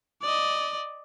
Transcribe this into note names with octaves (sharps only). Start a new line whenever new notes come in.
D5 D#5